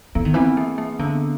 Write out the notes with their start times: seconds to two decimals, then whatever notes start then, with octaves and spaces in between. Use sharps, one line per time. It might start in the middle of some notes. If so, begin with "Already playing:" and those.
0.15 E3 B3
0.25 D#3
0.34 E3 C4
0.57 A#3
0.78 A#3
0.99 D3 B3